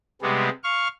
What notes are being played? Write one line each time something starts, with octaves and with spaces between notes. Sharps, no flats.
C3 G3 G#3 B3
F5 C#6 F6